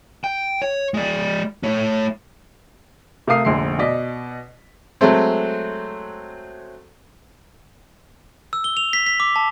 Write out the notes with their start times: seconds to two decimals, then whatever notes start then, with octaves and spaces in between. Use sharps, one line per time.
0.24 G5
0.62 C#5
0.94 G#3 D5
1.63 A3 C#5
3.27 C3 A3 A#4 F5 D#6 C7
3.45 F1 A#1 D3 C6 C7
3.79 B2 D5 D#5 B6
5.01 F#3 G#3 A3 C4
8.53 E6
8.64 G7
8.77 F7
8.93 B6
9.06 B6
9.20 D6
9.36 A5